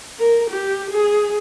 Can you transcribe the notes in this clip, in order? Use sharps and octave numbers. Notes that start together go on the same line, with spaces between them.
A#4
G4
G#4